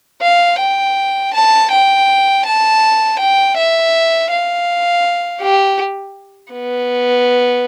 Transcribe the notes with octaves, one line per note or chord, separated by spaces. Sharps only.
F5
G5
A5
G5
A5
G5
E5
F5
G4
B3